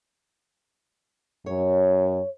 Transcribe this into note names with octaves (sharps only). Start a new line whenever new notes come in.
F#2 C#5